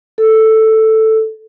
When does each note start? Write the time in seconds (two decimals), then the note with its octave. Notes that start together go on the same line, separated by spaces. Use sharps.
0.18 A4